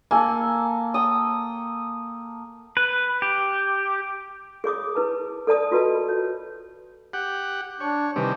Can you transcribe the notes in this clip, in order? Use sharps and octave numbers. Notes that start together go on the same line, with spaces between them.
A#3 A4 G#5
G5 D#6
B4
G4
G#4 C#5 D6 D#6
E4 B4 A5
A4 D5 A5 D#6
F4 F#4 B4 D#5 A5
C#5
G4 F#5
D4 C#5
C3 D#3 E3 G3